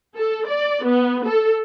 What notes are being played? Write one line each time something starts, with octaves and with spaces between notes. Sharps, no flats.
A4
D5
B3
A4